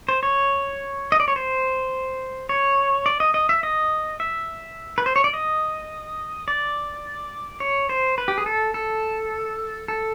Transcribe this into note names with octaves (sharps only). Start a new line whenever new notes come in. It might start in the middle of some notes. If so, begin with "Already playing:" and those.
C5
C#5
D#5
D5
C#5
C5
C#5
D5
D#5
D#5
E5
D#5
E5
B4
C5
C#5
D5
D#5
D5
C#5
C5
B4
G4
G#4
A4
A4
A4